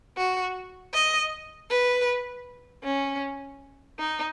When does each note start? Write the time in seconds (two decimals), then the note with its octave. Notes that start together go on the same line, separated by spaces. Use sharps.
0.17 F#4
0.94 D#5
1.70 B4
2.84 C#4
3.99 D#4